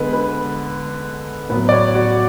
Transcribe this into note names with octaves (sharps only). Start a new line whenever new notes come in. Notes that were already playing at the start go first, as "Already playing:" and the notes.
Already playing: D3 G#3 B3 B4
B4
A2 F#3 B3 B4
D5
C#5
F#4